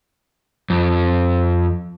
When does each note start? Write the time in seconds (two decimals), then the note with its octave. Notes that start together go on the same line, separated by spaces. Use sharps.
0.70 F2